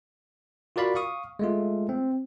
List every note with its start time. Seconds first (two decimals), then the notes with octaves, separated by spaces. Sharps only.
0.76 F4 F#4 A#4 D5 F5 B5
0.95 F5 C#6 D#6
1.39 G#3 A3 F4
1.89 C4